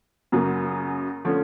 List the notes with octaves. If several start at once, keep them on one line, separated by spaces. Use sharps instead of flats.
F#2 C#3 F#3 A#3
D3 F3 A3 C#4